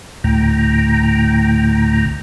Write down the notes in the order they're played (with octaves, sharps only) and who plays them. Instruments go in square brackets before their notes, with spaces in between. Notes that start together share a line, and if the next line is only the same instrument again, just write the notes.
[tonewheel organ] D2 A2 G5 A#5